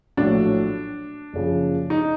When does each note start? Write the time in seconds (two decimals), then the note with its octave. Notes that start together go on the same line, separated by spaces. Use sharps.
0.17 A#1 A2 F#3 D4
1.33 F#1 F#2 C#3 F3
1.90 D#4